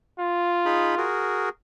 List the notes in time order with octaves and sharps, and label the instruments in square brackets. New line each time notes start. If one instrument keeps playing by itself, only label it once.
[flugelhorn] F4
[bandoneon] D#4 G#4 B5
F#4 G#4 A#4